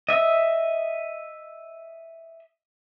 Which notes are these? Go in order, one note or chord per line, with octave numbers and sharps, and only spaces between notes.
D#5 E5